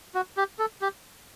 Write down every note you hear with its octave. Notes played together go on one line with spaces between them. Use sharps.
F#4
G4
A4
G4